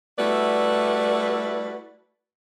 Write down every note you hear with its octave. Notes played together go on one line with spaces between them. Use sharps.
G3 A3 E4 F#4 B4 D5